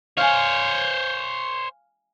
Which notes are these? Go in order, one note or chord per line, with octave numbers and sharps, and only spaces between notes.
C5 C#5 F5 G#5